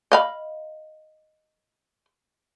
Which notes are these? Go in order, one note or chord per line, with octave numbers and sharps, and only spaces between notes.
D#5 F5 B5